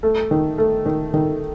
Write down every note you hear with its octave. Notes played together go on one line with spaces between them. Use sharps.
A3
D#3
A3
D#3
D#3